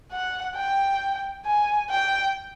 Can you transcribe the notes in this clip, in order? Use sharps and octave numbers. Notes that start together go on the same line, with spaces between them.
F#5
G5
G#5
G5